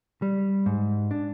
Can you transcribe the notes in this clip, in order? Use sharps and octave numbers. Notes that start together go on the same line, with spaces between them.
G3
G#2
D4